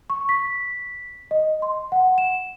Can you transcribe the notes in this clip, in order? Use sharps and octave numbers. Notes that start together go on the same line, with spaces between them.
C#6
B6
D#5
C6
F#5
E7